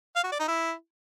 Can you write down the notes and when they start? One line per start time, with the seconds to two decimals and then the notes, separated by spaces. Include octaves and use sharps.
0.16 F5
0.24 F#4
0.32 D5
0.40 D#4
0.48 E4